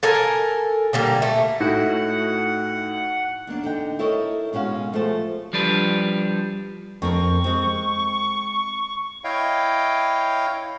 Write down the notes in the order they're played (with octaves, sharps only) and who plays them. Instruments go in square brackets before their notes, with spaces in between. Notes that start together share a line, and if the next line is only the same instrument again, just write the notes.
[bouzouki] A4 A#4 G#5
D3 G3 A#3
A3
[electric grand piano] A2 A3 [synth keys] D#4 E4 F#4 [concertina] F#5
[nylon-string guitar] E2 A#3 D4 D5
D3 D#4 G5
E4 A4 A#4 C#5 D#5
B2 G#3 C#4 F#4 F5
F3 A3 G#4 C5 A5
[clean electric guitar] F3 G3 D4 B4
[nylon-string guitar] F2 C4 A#4 [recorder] C#6
[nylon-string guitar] G#3 C4
[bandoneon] E4 C#5 D#5 F5 G5